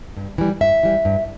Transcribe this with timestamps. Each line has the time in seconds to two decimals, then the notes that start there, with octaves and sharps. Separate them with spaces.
0.17 G2
0.38 E3 G3
0.61 G2 E5
0.83 E3 G3
1.05 G2